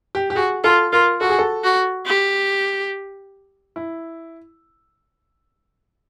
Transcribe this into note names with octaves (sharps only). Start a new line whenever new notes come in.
G4
G4
F#4 G#4
F4 A4
F4 A#4
F#4 A4
G#4
A4
F#4
G4
E4